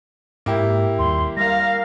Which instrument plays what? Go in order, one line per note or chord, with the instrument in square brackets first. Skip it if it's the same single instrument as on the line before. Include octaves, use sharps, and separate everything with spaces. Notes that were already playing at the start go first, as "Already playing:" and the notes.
[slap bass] G#2 [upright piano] A#3 E4 G4
[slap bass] D#2 G3 [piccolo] C6
[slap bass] G3 [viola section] A#4 F5 [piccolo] A#6